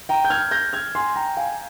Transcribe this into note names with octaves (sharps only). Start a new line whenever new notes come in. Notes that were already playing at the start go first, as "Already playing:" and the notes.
G5 A#5
G6
F6 G#6
G6 A#6
F6 G#6
G#5 C6
G5 A#5
F5 G#5